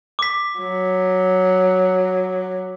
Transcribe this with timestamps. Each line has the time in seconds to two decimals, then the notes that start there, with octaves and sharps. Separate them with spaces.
0.19 D6 B6
0.60 F#3